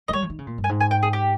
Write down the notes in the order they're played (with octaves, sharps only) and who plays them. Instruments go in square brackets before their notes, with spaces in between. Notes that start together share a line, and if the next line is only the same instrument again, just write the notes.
[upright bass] G#3 [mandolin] D#5
[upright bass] G3 [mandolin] C#5
[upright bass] F3
D#3
C#3
A#2
G2
[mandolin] G#5
[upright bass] G#2
[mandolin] G#5
G5
G#4
G4